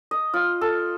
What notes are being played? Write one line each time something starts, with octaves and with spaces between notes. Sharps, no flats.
D#5
F4
A4